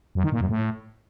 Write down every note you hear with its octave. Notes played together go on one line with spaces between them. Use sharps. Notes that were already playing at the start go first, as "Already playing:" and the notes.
F#2
D#3
A#2
F#2
A2